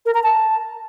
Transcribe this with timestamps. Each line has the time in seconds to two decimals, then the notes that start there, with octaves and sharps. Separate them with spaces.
0.06 A#4
0.15 A#5
0.23 A5